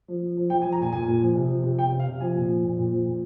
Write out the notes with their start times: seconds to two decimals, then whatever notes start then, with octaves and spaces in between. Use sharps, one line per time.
0.08 F3
0.22 F3
0.37 F3
0.50 F3 G5
0.62 G#5
0.65 F3
0.72 A#5
0.80 A#2 G#5
0.93 A#2 G#5
1.07 A#2
1.22 F3
1.36 C3
1.49 F3
1.63 C3
1.78 C3 G5
1.93 C3
2.00 F5
2.07 C3
2.20 F3 G#5
2.35 A#2
2.49 F3
2.64 A#2
2.77 A#2
2.92 F3
3.05 A#2